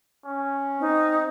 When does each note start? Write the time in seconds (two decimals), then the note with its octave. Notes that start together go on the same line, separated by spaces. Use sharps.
0.25 C#4
0.80 C4 D#4